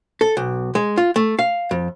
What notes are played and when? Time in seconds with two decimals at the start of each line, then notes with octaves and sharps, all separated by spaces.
0.21 A4
0.37 B1
0.75 G#3
0.97 F4
1.16 A3
1.39 F5
1.71 F2